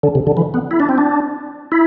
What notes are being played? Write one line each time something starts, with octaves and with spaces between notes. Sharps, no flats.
D3
C3
D3
E3
B3
E4
D4
C4
D4
E4